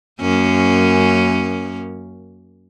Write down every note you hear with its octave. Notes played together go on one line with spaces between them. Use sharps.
F#2 A#3 C#4